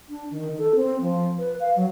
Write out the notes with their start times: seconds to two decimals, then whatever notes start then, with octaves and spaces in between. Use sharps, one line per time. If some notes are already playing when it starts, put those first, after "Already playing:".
0.09 D4
0.31 D#3
0.58 A4
0.75 C4
1.01 F3
1.39 B4
1.60 F5
1.76 F#3